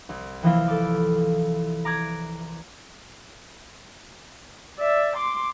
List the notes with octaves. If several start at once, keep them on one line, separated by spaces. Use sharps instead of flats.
C2
C3 E3 F3 A#3 E4 F4
A4 D6
A#5 D6 F#6 G#6
D5 E5
C6 D6